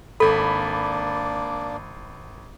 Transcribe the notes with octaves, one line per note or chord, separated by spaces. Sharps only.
G#1 A#3 D4 A4 D5 B5